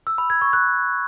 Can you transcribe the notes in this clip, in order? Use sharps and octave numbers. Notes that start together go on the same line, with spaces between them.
E6
B5
G#6
C#6
F#6